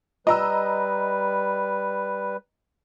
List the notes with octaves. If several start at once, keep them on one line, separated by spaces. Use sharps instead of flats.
G3 B4 D#5 A#5 E6